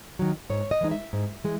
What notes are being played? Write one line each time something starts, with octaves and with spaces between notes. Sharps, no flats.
D#3 F#3
G#2 C#5
D#5
E3 G#3 D#4
E5
G#2
E3 G#3